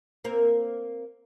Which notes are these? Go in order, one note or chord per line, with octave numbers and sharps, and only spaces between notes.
A#3 C4 A#4